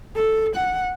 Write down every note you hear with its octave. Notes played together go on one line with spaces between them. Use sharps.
A4
F#5